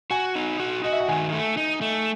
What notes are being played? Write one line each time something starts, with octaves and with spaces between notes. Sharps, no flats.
F#4 G#5
D#4
F#4
F#4 D#5
E5
F#5
D#3 G#5
A3
D#4
A3